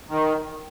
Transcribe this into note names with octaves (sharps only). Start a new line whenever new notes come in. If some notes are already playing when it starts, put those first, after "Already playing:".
D#3